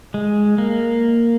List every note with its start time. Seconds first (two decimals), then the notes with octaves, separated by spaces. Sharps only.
0.14 G#3
0.58 A#3